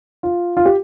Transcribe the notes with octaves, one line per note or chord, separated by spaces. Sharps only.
F4
F4
G4